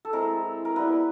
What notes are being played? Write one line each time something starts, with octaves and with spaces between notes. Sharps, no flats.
A4
G#3 C4 E4 A#4
A#4
G3 B3 E4 B4